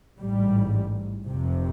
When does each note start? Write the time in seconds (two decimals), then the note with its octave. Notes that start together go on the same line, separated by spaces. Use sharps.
0.20 A1 G#2 G3
1.27 F1 F2 C3